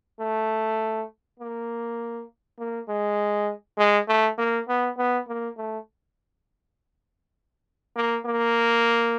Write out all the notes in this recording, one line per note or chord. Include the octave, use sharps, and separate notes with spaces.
A3
A#3
A#3
G#3
G#3
A3
A#3
B3
B3
A#3
A3
A#3
A#3